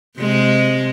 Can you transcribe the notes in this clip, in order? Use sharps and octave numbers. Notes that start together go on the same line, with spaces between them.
C3 G#3